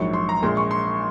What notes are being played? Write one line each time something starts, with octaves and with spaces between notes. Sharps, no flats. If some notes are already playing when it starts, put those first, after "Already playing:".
Already playing: A#1 G#2 F#3 C#6
C6
A#5
A#1 A#2 G#3 C6
C#6
C6